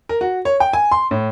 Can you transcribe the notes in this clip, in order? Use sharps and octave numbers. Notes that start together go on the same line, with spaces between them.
A#4
F#4
C#5
G5
G#5
C6
A2